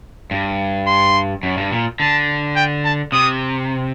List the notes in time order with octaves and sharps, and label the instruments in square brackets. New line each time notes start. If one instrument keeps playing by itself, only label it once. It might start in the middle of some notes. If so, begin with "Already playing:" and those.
[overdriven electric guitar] G2
[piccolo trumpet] C6
[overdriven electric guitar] F#2
G2
A#2
[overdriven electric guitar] D3 [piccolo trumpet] A5
[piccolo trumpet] G5
A5
[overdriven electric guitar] C3 [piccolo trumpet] D#6